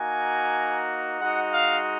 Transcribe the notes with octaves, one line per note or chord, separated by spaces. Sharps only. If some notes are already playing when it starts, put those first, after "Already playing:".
Already playing: A#3 D#4 F#4 G#5
G#3 D#4 F#4 F#5
F5